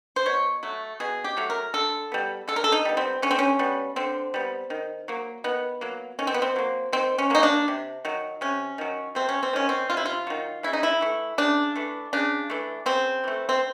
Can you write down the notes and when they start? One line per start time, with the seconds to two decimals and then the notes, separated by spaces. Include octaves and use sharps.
0.16 C5
0.26 B2 C#5
0.63 F#3 A3
1.00 B2 G#4
1.24 G4
1.37 F#3 A3
1.50 A#4
1.74 D3 A4
2.12 G3 B3
2.48 D3 A4
2.56 A#4
2.64 A4
2.72 D#4
2.85 G3 B3
2.97 C4
3.22 D3 C#4
3.31 C4
3.39 C#4
3.59 G3 B3
3.96 D3 C4
4.34 G3 B3
4.70 D#3
5.08 F#3 A#3
5.44 D#3 B3
5.81 F#3 A#3
6.19 D#3 C#4
6.27 C4
6.34 B3
6.42 C4
6.56 F#3 A#3
6.93 D#3 C4
7.18 C#4
7.30 F#3 A#3 D#4
7.43 D4
7.68 C3
8.05 D#3 F#3
8.41 C3 C#4
8.78 D#3 F#3
9.15 C3 C4
9.29 C#4
9.43 C4
9.53 D#3 F#3 C#4
9.69 C4
9.90 C3 F4
9.97 E4
10.05 F4
10.27 D#3 F#3
10.63 C#3 E4
10.73 D#4
10.83 E4
11.01 E3 A3
11.38 C#3 D4
11.76 E3 A3
12.13 C#3 D4
12.50 E3 A3
12.86 C#3 C4
13.24 E3 A3
13.49 C4